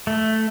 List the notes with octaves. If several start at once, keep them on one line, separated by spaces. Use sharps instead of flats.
A3